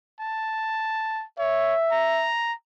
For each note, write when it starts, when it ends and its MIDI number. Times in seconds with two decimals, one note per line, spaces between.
0.20 1.24 81
1.39 1.74 73
1.39 2.30 76
1.92 2.53 82